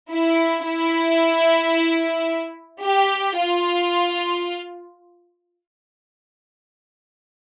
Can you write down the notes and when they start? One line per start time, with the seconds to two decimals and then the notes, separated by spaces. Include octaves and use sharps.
0.12 E4
0.66 E4
2.84 G4
3.38 F4